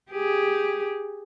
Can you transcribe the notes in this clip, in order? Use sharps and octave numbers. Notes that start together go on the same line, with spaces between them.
G4 G#4